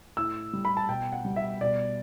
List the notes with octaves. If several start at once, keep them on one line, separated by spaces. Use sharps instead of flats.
A2 E6
G3
B5
A5
B2 G5
F#5
G3
E5
B2 D5